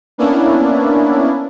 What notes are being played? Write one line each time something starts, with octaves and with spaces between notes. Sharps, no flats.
A#3 B3 C#4 D4 E4